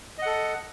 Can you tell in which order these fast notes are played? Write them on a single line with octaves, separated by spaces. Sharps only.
D#5 F#5 A4